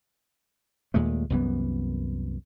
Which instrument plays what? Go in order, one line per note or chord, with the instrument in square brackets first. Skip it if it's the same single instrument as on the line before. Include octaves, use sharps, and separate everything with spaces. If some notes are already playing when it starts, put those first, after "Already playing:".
[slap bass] D#2 A#2 G#3 A3
C2 F#2 E3 B3